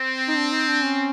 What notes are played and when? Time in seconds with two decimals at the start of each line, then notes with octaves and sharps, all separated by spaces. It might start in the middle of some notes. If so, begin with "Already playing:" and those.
Already playing: C4
0.28 D#4
0.37 D4
0.52 D#4
0.68 D4
0.83 C#4